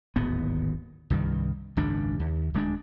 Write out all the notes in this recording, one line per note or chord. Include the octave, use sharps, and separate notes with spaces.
D1 G#1 D#2 B3
C2 G2 D#3
G#1 C#2 F#2 D4
D#2
D1 G#3 D4